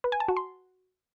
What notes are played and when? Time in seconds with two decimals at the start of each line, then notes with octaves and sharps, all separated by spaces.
0.04 B4
0.12 G#5
0.20 A5
0.28 F#4
0.37 C6